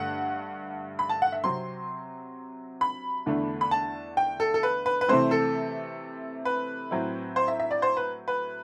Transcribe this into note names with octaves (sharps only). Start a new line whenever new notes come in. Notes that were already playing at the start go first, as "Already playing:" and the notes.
Already playing: G2 D3 A3 F#5
B5
A5
F#5
E5
C3 F#3 C4 C6
B5
E2 D3 A3 D4
B5
A5
G5
A4
A4
B4
B4
B4
C3 E3 A3 C4 C5
A4
B4
A2 F#3 C4 E4
C5
E5
E5
D5
C5
B4
B4